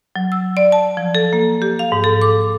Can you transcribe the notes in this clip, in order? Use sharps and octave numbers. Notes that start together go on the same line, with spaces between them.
F#3
E6
D5
A5
F3
A4
A#3
G4
F5
G#2
A4
D6